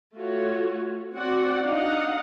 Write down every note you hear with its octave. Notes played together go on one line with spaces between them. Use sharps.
A3 F4 F#4 C#5
C4 F#4 D5 F#5
D4 D#4 D#5 F5 F#5